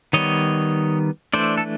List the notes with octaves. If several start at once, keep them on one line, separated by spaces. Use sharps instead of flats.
D#3 G3 B3 C#5 D#5
E3 A3 D4 C5 D5
A4